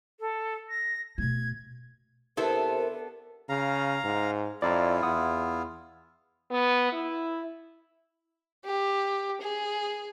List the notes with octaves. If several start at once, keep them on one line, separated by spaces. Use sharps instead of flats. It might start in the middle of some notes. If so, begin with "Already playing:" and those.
A4
A#6
B2 A3 G#6
C3 B3 D4 E4 A4 A#4 C5
C#3 F5 A#5
G#2
F2 E4 F4 D5 A#5
E2 F#5 D#6
B3
E4
G4
G#4